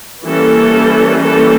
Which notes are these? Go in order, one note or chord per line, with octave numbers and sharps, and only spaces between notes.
E3 G3 A#3 C#4 A4
A4